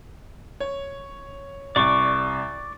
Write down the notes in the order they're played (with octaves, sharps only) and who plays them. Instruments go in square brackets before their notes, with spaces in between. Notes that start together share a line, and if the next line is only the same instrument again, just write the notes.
[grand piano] C#5
[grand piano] C2 [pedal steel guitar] D5 C#6 D6